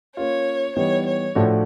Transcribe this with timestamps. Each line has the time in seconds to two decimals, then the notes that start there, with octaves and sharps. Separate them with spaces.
0.17 A#3 C#4 F4 C#5
0.76 E3 G3 B3 D#4 G4 C#5
1.06 C#5
1.35 A2 F3 A3 D4 F#4